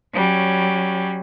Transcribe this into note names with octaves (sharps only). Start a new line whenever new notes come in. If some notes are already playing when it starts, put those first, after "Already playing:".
F#3 G3 C#4